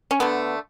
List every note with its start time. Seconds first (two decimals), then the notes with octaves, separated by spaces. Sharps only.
0.11 C#4
0.20 D3 A3 B3